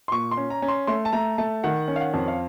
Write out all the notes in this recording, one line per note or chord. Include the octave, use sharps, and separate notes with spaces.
C6
A#2 C#6
C6
C#4
A#5
C#4
C6
A3 C6
A5
A3 A#5
A3 A5
D#3 F#5
C#4
F5
F#5
F2
F5